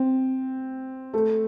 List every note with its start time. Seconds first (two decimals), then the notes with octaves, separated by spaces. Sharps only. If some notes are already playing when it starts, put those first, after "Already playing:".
Already playing: C4
1.14 A3